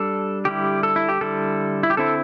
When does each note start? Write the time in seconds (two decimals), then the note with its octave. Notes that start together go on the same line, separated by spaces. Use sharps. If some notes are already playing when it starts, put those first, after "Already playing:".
Already playing: G3 D4 A4
0.45 D3 G3 E4 G4
0.83 A4
0.96 E4
1.09 G4
1.21 D3 G3 E4 A4
1.83 E4
1.90 G4
1.97 D3 C4 E4 A4